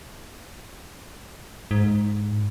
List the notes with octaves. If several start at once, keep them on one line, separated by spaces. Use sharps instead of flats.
G#2